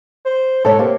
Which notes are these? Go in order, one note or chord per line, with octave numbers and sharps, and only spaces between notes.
C5
G#2 A4 C#5
C3 A#3